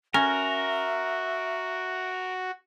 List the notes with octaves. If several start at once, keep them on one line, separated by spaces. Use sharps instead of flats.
C#4 F#4 A#4 E5